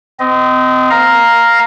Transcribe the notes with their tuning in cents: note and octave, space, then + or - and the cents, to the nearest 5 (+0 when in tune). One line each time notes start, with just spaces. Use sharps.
C4 -30 D#5 +0
F5 +0 A#5 +0